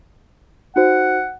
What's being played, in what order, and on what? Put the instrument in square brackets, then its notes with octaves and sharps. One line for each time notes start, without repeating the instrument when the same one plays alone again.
[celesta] D#4 F#4 C5 [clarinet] F#5